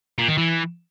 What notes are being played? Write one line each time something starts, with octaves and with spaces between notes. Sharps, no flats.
A#2
D#3
E3